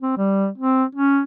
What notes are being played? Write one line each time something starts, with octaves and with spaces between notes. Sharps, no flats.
C4
G3
C4
C#4